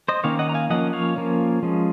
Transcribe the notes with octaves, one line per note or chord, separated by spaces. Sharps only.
C5 D#5
D#3 A#3 C#4 C#5 F5
D#5 F#5
A#5
F5 G#5
F3 A#3 C#4 D#5 F#5
C#5 F5
F3 A#3 C#4
F3 G#3 C#4